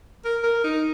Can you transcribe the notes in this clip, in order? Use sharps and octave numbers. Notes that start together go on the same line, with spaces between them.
A#4
A#4
D#4